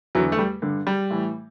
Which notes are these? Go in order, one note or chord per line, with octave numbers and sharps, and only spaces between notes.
E2 D3 F#3
A3
G3
G2 D3
G3
A2 E3